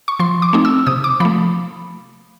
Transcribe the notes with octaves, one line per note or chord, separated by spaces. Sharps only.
C#6
F3 C6
D6
A3 C4 D#4
E6
C3 D#6
D6
F3 A3 B5